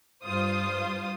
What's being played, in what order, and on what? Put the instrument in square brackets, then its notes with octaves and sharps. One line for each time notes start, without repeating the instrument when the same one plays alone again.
[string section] G2 F4 C5 D#6